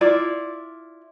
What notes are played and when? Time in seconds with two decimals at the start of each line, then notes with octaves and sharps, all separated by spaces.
0.01 E4 F4 D5